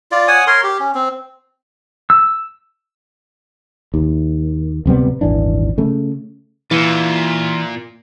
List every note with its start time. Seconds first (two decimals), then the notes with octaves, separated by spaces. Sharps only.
0.12 F4 D5
0.28 C#5 F#5 G#5 D#6
0.47 A#4 C#5 C6
0.64 G4
0.80 C#4
0.95 C4
2.10 E6
3.94 D#2
4.86 D1 C3 G3 B3
5.21 D#1 G#1 E3 D4
5.78 C#3 A3
6.71 A#2 E3 F4 E5